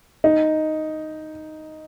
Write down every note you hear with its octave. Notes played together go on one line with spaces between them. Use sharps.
D#4